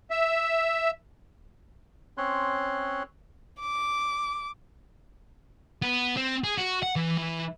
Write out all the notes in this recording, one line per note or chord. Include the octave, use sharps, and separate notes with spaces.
E5
C4 C#4 C#5 C6 F#6
D6
B3
C4
G#4
F#4
F#5
E3
E3